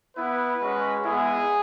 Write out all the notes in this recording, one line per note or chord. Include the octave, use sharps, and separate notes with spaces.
B3 E4 B4
G#3 C#4 F#4
G#3 B3 E4 G#4